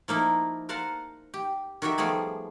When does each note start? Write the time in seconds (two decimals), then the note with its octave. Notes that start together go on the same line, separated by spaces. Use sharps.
0.08 F3 A#3 D#4 E4
0.69 A#4 C5 F5 F#5 A5
1.34 G4
1.82 D#3 F#4 G4 E5
1.98 F3 G3 A3 B3 G#4